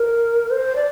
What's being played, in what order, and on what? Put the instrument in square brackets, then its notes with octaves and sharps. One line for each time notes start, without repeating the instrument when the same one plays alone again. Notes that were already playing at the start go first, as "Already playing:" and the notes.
Already playing: [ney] A#4
C5
D5